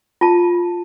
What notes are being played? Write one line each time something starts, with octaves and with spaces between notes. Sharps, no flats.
F4 A5